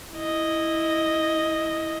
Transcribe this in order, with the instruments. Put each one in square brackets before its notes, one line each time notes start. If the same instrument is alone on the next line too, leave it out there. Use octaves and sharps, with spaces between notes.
[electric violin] E4 D#5